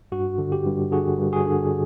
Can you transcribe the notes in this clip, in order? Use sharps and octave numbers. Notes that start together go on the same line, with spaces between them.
G2 F#4
D3
G4
G2
D3 F#4 G#4
G2
F#4 G#4
D3